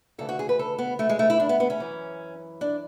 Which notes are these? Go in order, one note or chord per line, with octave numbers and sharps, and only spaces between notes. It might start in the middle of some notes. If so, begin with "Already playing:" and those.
D2 C#3 E3 A4
F#4
G#4
B4
A4
B3
A3
G#3
A3
E4
D4
B3
B3
C#4
F#2 E3
D4